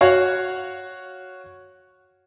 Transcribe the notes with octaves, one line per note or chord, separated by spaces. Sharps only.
F#4 C#5 F5 F#5